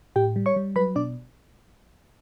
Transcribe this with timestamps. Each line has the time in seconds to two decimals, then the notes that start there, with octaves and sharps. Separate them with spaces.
0.16 A2 G4 G5
0.36 G3
0.46 C#5 C#6
0.56 G3
0.76 F#3 B4 B5
0.96 B2 D4 D5